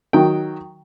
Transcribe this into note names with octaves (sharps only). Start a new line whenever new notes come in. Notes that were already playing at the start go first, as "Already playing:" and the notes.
D#3 F#3 G5